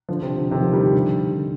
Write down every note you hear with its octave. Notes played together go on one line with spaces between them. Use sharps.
D3 F3
C3
D3
C3 D#3
D3 F3
D#3 G3
D3
D3